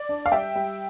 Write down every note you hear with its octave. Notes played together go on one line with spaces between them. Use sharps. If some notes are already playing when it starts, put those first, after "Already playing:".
Already playing: D5
D4
F5
G3 E5 G5
G3